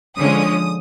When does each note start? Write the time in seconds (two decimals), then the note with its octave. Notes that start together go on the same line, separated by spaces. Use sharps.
0.17 D3 F3 G#3 C#4 D#6